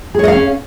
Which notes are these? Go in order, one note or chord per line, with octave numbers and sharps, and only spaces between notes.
C#4 G#4 C#5 D#5 F5